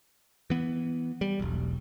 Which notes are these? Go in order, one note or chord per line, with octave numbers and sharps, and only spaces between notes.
E3 B3
G3
E1 B1